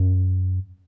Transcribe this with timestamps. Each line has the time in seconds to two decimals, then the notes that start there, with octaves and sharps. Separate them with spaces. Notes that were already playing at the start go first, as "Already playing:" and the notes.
Already playing: F#2